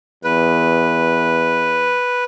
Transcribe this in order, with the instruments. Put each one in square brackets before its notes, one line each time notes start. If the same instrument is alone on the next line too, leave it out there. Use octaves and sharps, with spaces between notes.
[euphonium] E2 [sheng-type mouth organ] B4